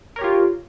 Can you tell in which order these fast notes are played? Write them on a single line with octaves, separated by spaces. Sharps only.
A#4 C#5 G4 F4